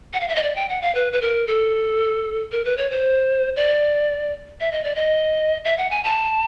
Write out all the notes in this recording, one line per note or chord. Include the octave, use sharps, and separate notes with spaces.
F#5
F5
E5
D#5
D5
G5
F#5
F5
B4
B4
A#4
A4
A#4
B4
C#5
C5
D5
E5
D#5
D5
D#5
E5
F#5
G#5
A5